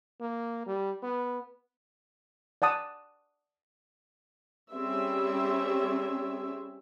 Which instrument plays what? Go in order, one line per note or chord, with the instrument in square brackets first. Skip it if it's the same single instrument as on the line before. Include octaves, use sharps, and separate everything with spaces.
[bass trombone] A#3
G3
B3
[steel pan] D5 F#5 A5 D#6
[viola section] G3 C4 C#4 G#4 E5